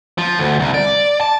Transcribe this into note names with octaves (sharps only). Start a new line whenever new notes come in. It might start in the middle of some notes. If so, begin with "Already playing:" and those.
F3
D2
C2
D5
A5